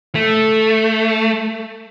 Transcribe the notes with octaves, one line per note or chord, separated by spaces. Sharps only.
A3